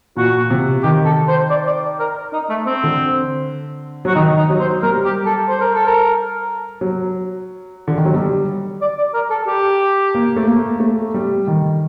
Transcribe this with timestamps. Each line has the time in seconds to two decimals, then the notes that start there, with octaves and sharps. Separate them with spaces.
0.17 A#2 F#4
0.50 C3
0.83 D#3 G4
1.05 A4
1.28 C5
1.50 D5
1.67 D5
1.99 A#4
2.33 D#4
2.50 A3
2.66 C4
2.84 D3
4.05 F#3 F#4
4.15 D#3 D#4
4.37 D#4
4.50 F#3
4.60 C5
4.83 G3 A#4
5.05 G4
5.26 A4
5.49 C5
5.61 A#4
5.74 A4
5.87 A#4
6.81 F#3
7.88 D3
7.98 D#3
8.05 F#3
8.14 G3
8.82 D5
8.98 D5
9.14 A#4
9.30 A4
9.47 G4
10.15 A#3
10.37 A3
10.47 A#3
10.80 A3
11.14 G3
11.48 D#3